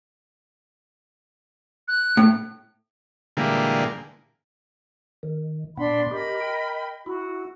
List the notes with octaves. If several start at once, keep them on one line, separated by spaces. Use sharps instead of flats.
F#6
A2
A#2 D3 E3 G3 G#3 A#3
D#3
A#2 B3 D4 B5 C6
G4 A#4 D#5 B5
G5
E4 F#4